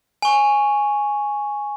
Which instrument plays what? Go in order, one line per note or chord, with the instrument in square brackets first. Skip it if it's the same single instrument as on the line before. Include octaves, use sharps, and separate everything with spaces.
[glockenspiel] G#5 C#6